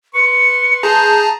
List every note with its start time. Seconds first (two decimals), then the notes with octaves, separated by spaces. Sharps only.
0.14 B4 C6 C#7
0.83 G#4 A5 A#5 G6